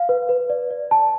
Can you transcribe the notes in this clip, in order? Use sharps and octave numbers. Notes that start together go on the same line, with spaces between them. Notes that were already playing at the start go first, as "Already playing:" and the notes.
Already playing: F5
B4
B4
D5
D5
A5